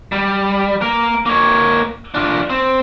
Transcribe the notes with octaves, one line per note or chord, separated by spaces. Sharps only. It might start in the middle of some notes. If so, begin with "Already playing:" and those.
G3
A#3 A#4
A#3 C#5
D4 F4
C4